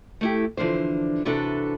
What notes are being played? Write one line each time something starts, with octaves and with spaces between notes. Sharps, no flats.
A3 E4 G4
D3 E3 F3 D4 C5
C3 E3 D4 F#4 A4 B4